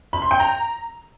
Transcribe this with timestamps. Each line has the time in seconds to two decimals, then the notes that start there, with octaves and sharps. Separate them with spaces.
0.13 B5
0.22 C6
0.31 G5
0.40 A#5